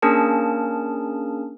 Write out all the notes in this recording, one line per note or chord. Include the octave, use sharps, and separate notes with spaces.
A#3 C#4 D4 G#4 A#4 A5